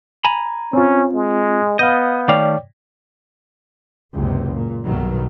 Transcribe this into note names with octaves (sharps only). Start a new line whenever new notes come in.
G#5 A#5 B5
C4 C#4 F4
G#3
B3 D#5 F5 G6
D#3 A3 C#5 D5 F5 G5
F#1 C#2 C3
A#2
B1 G2 B2 D#3 F#3